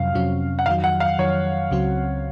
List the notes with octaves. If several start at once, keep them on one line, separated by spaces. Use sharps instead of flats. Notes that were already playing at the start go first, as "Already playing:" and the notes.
Already playing: F2 C3 F#3 C#4 F5
F2 C3 F#3 C#4
F#5
F2 D#3 F#3 F5
F#5
F5
F2 D#3 F#3 C#5
C#2 C#3 F#3 C4 F#4